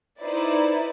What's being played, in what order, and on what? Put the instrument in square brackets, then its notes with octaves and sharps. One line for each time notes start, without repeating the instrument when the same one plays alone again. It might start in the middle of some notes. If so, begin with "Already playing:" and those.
[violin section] D#4 E4 B4 C5 D5